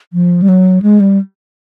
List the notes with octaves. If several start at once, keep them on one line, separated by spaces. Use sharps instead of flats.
F3
G3
F#3
G#3
G3